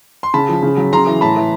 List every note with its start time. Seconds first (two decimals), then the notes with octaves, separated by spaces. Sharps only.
0.23 C6
0.34 C#3 A5 B5
0.49 F3
0.63 C#3
0.77 F#3
0.93 C#3 A#5 C6
1.07 E3
1.21 A2 A5 B5
1.37 E3